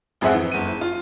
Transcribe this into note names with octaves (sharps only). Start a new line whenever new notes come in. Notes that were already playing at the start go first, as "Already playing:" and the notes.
G#1 F2 C4 G#4 E5 F#5
E3
F#1 D#7
F4